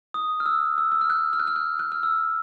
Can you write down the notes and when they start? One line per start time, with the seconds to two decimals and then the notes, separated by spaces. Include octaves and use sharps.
0.14 D#6
0.40 F6
0.46 E6
0.78 E6
0.92 E6
1.01 F6
1.10 F#6
1.33 F6
1.40 F#6
1.47 F6
1.56 F#6
1.79 F#6
1.92 F6
2.03 E6